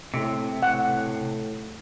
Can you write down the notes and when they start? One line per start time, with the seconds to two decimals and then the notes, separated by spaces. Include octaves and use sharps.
0.14 A2 C3
0.63 A2 F#5